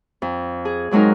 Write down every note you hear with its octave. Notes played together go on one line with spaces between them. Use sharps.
F2
G#4
F2 F#3 G#3 D#4 A#4